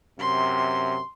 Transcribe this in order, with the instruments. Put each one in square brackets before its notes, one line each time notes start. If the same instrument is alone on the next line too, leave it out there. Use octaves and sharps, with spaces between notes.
[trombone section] F#2 C3 [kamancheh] C6